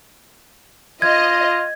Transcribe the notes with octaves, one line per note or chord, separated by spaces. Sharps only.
F4 D#5 G#6